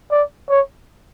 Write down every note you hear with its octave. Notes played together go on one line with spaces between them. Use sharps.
D5
C#5